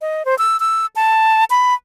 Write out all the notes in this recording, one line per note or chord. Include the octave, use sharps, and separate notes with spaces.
D#5
C5
E6
E6
A5
B5